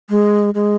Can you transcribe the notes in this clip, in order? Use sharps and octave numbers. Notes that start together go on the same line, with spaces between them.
G#3
G#3